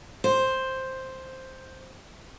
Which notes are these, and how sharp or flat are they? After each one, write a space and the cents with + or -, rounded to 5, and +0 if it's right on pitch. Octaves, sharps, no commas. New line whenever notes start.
C5 +5